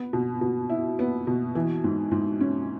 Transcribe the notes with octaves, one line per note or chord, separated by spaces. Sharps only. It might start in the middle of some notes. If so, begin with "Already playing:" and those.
Already playing: B3
B2
B2
E4
B3
B2
E3
G#2
G#2
C#4